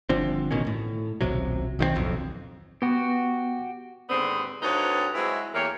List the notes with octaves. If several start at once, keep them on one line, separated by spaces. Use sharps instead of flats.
G1 D3 F3 C4
A1 B2 D#3 C#4
A2
D#1 B1 C3 F#3
B1 D#3 E3 C4
D1 B1 F2
B3 F#4 G4
D#2 G#2 D3 B3 C4
D2 G2 C4 D#4 B4 C#5
F#3 G#3 C4 E4
E2 E3 A3 A#3 G4 C#5